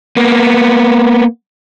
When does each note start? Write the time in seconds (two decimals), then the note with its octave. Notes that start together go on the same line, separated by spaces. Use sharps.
0.17 A#3 B3